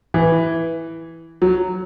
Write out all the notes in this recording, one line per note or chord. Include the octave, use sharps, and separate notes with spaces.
E3
F#3